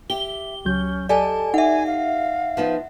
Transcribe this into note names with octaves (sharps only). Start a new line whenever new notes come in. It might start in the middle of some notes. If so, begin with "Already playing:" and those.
G4 E5 G7
C#2 F#3 C#4 G6
G4 A4 D5 D#5 G#5 A5
D#4 E5 F#5 G#5
F5
F3 B3 D#4